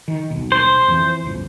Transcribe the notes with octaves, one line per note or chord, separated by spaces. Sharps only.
D#3
D#1 B1
C5
F2 E3
G1 C#2